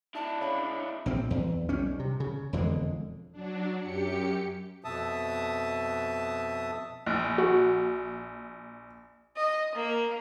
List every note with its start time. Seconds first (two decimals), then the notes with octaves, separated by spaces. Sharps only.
0.15 D4 E4 A5
0.40 C#3 B5
1.06 A#1 F3 C4
1.30 E2
1.69 B1 G3 C#4
1.99 C3
2.20 C#3
2.53 E1 F2 D3 G#3
3.32 F#3 D4
3.79 F#2 G4 C#7
4.84 F2 B2 E5 A5 D#6
7.06 A#1
7.38 F#4
9.37 D#5
9.75 A#3